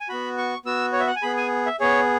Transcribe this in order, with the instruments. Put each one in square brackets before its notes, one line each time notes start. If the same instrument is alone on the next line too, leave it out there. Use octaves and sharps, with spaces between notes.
[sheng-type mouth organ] G#5
B3 F#4 B5
C#6
B3 F#4 E6
C#5
E5
F#5
G#5
B3 G#4 B5
G#5
E5
B3 G#4 C#5